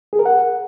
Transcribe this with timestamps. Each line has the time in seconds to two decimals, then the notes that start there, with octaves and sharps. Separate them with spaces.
0.13 G#4
0.19 A#4
0.26 F#5